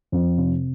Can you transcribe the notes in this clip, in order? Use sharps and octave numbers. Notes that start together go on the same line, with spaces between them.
F2
C3